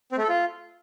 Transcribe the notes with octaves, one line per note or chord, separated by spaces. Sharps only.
C4
A3
A4
F4